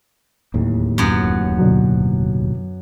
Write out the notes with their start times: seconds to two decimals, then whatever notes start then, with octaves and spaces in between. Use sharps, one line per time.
0.54 D1 D#2 A2
0.98 F#2 B3
1.59 B2 D3 F#3